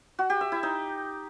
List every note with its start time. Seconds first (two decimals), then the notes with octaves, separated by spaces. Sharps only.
0.19 F#4
0.30 G4
0.41 E5
0.52 E4
0.63 D#4